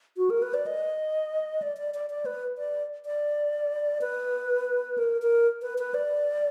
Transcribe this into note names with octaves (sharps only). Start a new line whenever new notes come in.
F#4
A#4
B4
D5
D#5
D5
D5
D5
D5
B4
D5
D5
B4
A#4
A#4
B4
B4
D5